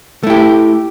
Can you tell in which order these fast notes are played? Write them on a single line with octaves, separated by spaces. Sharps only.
A3 E4 G4